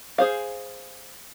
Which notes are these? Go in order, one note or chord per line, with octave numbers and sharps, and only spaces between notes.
G#4 C5 F5